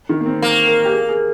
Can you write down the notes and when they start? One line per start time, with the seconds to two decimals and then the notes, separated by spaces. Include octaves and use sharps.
0.09 D#3
0.20 A#3
0.26 C4
0.42 A#3
0.67 A#4
0.85 G4
0.92 G#4
1.09 G#4